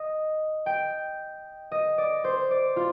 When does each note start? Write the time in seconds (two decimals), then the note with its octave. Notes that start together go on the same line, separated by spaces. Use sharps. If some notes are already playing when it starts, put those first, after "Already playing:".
Already playing: D#5
0.66 G5
1.72 D#5
1.98 D5
2.24 C5
2.51 D5
2.76 F4